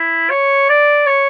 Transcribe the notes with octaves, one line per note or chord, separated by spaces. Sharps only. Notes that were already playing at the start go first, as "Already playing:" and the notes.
Already playing: E4
C#5
D5
C#5